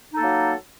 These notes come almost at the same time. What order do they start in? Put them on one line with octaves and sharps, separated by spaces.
D#4 A4 A#3 F#3